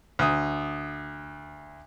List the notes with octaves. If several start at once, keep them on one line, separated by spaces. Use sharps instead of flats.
D2 D#6